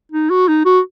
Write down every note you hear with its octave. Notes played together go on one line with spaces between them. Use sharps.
D#4
F#4
D#4
F#4